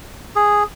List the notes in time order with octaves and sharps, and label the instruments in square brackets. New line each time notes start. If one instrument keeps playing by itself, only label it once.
[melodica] G#4